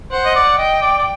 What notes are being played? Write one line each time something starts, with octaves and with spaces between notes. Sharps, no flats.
C5 F#5
D#5
D5
D#5 G5
D5
D5